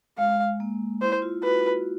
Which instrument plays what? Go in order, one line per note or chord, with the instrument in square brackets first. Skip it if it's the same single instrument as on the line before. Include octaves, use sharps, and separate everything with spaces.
[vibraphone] G#3 [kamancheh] F5
[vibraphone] A#3
[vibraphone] E4 [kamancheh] C5
[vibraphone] F4
[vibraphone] F#4 [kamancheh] B4